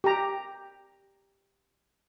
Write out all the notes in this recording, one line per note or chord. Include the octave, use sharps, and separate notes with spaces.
G4 A#5